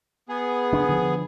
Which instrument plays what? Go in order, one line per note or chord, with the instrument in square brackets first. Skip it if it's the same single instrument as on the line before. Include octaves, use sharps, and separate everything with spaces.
[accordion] B3 G#4
[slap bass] F#1 D4
D3 F3